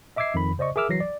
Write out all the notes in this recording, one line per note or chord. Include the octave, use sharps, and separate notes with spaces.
D#5 E5 D6 E6 G#6 C7
F2 D#3 B5
C#3 C5 D5 D#5 C#6
G#4 A#4 E5 D6 E6 F6
E3 F#3 A#6 C7
D5